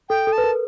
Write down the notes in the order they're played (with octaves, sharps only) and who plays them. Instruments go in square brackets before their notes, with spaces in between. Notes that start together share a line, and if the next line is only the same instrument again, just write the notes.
[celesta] A4 [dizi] G5
[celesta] A4
[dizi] A5
[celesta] B4
A#4